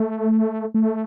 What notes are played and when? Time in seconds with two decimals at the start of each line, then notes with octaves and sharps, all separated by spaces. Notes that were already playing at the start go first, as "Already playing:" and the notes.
Already playing: A3
0.74 A3